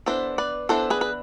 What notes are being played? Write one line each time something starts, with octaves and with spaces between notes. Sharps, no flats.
E3 B3 D4 A4 C5
B4 D5
E3 B3 D4 A4 C5
G#4 B4
B4